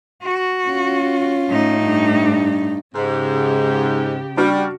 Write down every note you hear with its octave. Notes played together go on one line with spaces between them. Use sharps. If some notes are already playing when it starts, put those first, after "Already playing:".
F#4
C#4 F4
A2 D#4
G2
G#2 C#3 G4
G3 D4 F#4 F6